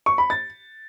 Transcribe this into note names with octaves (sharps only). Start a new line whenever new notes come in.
C#6
B5
A6